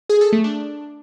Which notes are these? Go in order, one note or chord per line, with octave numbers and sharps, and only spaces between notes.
G#4
A4
A3
D4